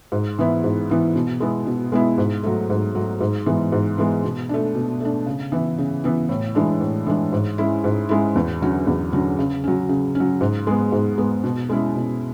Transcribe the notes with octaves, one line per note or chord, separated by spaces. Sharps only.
G#2
E3 B3 E4
G#2
E3 B3 E4
B2
G#3 B3 E4
B2
G#3 B3 E4
G#2
F#3 A3
G#2
F#3 A3
G#2
E3 G#3 B3
G#2
E3 G#3 B3
B2
A3 D4
B2
A3 D4
C#3
E3 B3 E4
C#3
E3 B3 E4
A2
E3 G#3 D4
A2
E3 G#3 D4
G#2
G#3 C#4 E4
G#2
G#3 C#4 E4
E2
D3 F#3 C#4
E2
D3 F#3 C#4
C#3
F#3 C#4
C#3
C#4
F#3
G#2
G#3 B3
G#2
G#3 B3
B2
G#3 C#4 E4
B2